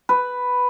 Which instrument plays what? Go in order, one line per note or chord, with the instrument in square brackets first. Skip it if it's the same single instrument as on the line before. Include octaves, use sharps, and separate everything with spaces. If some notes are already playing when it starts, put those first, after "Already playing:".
[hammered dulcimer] B4